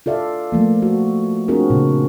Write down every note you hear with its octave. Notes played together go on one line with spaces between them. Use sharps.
F4 A4 D5 E5 F5
F3 A3 A#3
F#4
C4 D4 F4 F#4 G#4 A#4
A#2 C#3